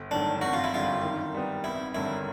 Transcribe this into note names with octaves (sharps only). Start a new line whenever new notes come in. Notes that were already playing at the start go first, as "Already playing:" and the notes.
Already playing: G1
G2 D#3 F#3 A3 D4
G#1 F#4
F4
E4
F#2 D3 G3 F4
D#3
G3 B3
G#1 E4
G2 D3 F#3 A#3 E4